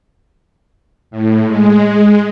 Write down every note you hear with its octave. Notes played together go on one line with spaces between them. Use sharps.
A2
G#3